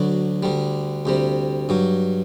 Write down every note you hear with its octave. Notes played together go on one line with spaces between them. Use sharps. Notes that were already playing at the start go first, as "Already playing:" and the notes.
Already playing: D2 D3 F#3 D4
D2 D3 G3
D2 C3 G3
G2 F#3